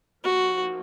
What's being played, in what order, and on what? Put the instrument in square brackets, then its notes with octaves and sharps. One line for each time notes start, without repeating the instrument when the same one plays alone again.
[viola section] F3 A#3 D#4 [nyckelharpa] F#4